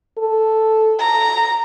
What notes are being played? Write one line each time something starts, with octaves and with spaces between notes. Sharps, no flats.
A4
A#5